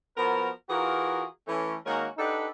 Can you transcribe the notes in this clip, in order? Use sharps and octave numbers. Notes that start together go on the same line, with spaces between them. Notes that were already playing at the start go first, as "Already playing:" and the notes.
F3 B3 F#4 A#4
E3 F4 F#4 G#4 A#4
E3 A3 C#4
D#3 G#3 A#3 C#4 F#4 A#4
D4 D#4 G4 A4 B4 F#5